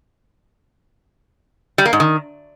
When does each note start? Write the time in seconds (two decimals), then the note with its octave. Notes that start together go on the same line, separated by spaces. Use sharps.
1.78 G3
1.86 A#3
1.93 G#2
2.00 D#3